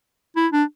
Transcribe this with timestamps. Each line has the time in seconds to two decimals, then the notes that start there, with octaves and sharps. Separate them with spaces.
0.36 E4
0.52 D4